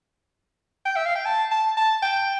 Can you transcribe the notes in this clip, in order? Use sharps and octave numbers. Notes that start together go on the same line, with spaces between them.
G5
E5
F5
G5
A5
A5
A5
G5